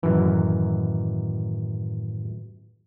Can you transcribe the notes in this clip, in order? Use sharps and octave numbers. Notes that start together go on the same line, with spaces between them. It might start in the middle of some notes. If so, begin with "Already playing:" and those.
F#2 A2 D#3 E3 F#3